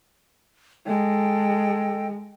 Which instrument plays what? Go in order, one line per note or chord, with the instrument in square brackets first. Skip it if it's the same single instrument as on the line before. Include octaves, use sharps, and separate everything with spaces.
[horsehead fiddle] G#3 [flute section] A4 D#5 G5